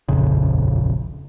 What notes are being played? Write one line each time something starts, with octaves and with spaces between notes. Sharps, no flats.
D#1 A#1 F2 C#3